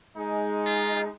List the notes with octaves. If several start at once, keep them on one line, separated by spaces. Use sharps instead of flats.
G#3 D#4
F4